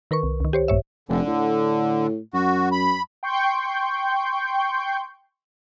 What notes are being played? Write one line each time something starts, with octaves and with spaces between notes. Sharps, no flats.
D#3 A#4 B4 C#6
C2
C#2 D#3
G4 C5 C#5
A#1 G2 C#5 E5
F1 D3
A2
F#2 F#4
B5
G5 C6 C#6 G6